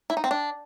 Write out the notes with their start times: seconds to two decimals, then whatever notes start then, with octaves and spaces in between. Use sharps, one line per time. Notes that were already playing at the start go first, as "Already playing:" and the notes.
0.10 E4
0.17 D#4
0.24 C4
0.31 D4